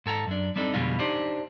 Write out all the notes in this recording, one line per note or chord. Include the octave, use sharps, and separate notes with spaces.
G#2 A4 G#5 A#5
F#2 D4
G3 C4 D4 D#4 A4
F2 B2 D3 G3 G#3 F4
D4 D#4 G4 C5